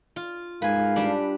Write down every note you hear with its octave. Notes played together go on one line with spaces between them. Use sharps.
F4
G#2 A#4 B4 F5 G#5
G3 D4